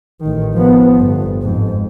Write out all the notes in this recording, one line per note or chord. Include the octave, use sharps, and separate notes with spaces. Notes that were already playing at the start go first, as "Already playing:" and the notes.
A1 D#3
F3 B3
G1
F2 G#2